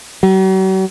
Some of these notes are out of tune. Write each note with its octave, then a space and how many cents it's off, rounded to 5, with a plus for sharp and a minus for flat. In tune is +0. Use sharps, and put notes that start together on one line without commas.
F#3 +45